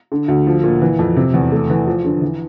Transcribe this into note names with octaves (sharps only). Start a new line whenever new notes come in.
D3
D2
F3
A#2
E3
F2
C3
E2
A3
E3
F3
D3
E3